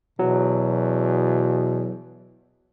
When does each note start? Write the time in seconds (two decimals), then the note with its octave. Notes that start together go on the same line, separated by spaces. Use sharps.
0.19 E2 B2 F#3